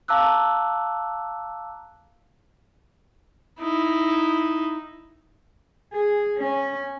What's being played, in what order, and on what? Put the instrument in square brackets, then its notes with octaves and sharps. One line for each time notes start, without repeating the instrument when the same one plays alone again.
[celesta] F5 A5 A#5 D6 E6 F#6
[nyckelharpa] D#4 E4
[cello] G#4
C#4